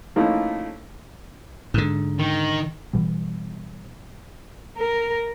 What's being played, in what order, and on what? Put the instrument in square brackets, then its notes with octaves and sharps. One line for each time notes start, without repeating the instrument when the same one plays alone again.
[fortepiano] F3 A3 A#3 C#4 D#4 E4
[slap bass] G#2 D3
[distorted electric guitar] D#3
[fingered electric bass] B2 E3 G3
[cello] A#4